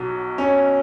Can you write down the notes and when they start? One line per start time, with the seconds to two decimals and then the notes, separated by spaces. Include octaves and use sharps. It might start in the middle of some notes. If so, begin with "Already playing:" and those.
Already playing: B1 B2 F#3 F#4
0.38 C#4